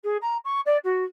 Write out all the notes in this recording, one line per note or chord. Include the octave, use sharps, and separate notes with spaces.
G#4
A#5
C#6
D5
F#4